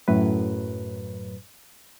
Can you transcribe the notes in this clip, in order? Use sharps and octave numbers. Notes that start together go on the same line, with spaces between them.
F#2 A2 F#3 B4